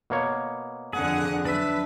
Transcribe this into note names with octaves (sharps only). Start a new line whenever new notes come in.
B2 A#3 C#5
F2 D3 G#4 F#5
F#3 D4 B4 E5